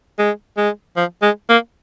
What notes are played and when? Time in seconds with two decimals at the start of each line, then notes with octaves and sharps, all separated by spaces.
0.19 G#3
0.57 G#3
0.97 F3
1.22 G#3
1.50 A#3